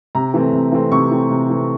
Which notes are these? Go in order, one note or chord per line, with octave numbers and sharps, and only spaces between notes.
C3 A#5
E3 A3 C4
C3
E3 A3 C4
C3 C#6
E3 A3 C4
C3
E3 A3 C4